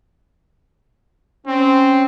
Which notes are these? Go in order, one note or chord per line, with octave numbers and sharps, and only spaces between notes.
C4 C#4